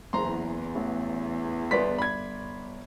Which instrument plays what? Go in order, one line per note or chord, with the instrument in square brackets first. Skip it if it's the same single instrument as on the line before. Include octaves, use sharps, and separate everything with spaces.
[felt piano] F#1 [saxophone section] E2 [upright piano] A#5 C6
[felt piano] A1
[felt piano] G1 D5 C6 [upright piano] B3 B6
[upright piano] B5 G#6